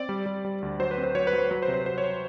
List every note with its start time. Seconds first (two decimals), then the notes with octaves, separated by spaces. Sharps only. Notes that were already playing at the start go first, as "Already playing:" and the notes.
Already playing: C4 D5
0.09 G3
0.26 G3
0.45 G3
0.62 D2
0.80 F#3 C5
0.91 B4
0.98 C4
1.03 C5
1.15 F#3 C#5
1.27 B4
1.33 F#3
1.38 C5
1.50 F#3 B4
1.62 C5
1.68 C3
1.74 C5
1.86 F#3 C5
1.98 C#5
2.04 C5